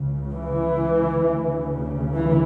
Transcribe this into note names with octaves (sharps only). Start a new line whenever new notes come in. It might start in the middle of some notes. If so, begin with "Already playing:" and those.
Already playing: C#2 C#3
E3
D2 C#3
E3